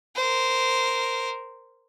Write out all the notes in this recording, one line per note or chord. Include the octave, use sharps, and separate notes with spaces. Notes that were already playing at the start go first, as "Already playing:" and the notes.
A#4 C5